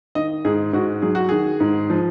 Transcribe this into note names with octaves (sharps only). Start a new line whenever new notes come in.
D#3 D#5
G#2 G#4
G#2 F#4
F#3 G#4
F#4
D#3 G#4
G#2
F3